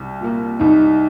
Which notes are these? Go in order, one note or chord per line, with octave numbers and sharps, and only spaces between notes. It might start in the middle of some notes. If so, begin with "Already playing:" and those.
Already playing: C2
A#2 A#3
C2 D#4